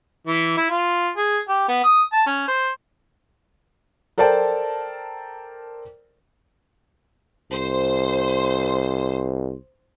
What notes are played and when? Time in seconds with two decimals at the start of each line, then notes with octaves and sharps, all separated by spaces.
0.27 E3
0.57 E4
0.70 F4
1.17 G#4
1.49 G4
1.68 B3
1.84 D#6
2.12 A5
2.26 C#4
2.48 C5
4.18 A4 A#4 C5 D5 G5 A5
7.52 C2 C5